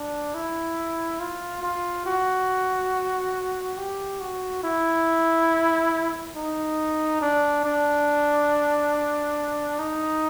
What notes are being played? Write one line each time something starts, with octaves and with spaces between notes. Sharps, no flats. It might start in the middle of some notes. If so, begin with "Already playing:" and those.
Already playing: D4
E4
F4
F4
F#4
G4
F#4
E4
D#4
D4
D4
D#4